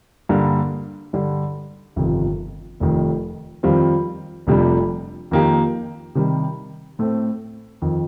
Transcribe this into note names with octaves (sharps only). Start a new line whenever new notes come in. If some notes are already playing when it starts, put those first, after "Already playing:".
G2 D3 G3 A#3 D4
G2 D3 G3 D4
G1 F2 C3 D#3
F1 F2 D#3
F2 D#3 G3 C4 F4
F1 F2 C3 G3 D4
F2 D#3 A#3 D#4 G4
C3 D#3 G3
A2 A3 C4
F2 D#3